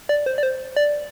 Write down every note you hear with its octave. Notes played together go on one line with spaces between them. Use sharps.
D5
C5
D5
C5
D5